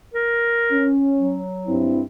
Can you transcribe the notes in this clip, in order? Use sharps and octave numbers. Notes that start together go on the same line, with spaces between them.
A#4
C#4
F#3
G2 C4 E4